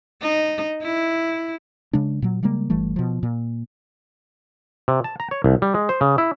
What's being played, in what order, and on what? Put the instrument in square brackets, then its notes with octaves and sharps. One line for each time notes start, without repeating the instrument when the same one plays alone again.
[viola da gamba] D#4
E4
[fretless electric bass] C#3 G#3 D4
A#2 F#3
C#3 G3 G#3 A#3
G1 E3 G3 A3
B2 F3
A#2
[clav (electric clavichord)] C3
A5
A#5
C#5
C2
G3
G#3
C5
C#3
E4